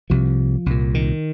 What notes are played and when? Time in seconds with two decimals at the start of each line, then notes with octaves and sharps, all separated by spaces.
0.10 C2 C3 F3
0.66 C2 A#2
0.94 D#3